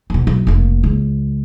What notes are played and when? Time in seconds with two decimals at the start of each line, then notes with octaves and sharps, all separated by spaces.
0.10 D#2 B2
0.27 B1
0.47 F1 A#3
0.84 C#2